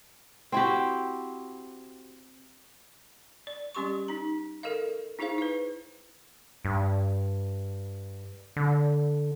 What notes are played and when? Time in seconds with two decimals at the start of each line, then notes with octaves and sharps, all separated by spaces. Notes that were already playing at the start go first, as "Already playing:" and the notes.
0.52 C4 E4 F#4 G4
3.47 D5
3.75 G3 C#4 G4 C6 C#6
4.08 D#4 A#5
4.63 A4 A#4 D#5 F5
5.19 D#4 E4 G#4 C5 F5
5.38 E4 B4
6.65 G2
8.56 D3